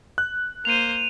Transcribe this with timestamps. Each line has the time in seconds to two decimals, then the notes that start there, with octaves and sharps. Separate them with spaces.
0.18 F#6
0.65 A#3 C5 D#7 F7